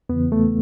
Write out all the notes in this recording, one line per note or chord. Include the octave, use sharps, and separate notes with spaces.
E2 C#3 E3 B3
A3